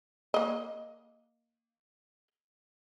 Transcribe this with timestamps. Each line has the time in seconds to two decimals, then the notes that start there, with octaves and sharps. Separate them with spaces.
0.34 A#3 D#5